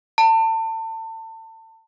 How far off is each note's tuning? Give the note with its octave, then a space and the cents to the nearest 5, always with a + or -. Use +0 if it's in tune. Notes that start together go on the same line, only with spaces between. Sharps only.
A5 +30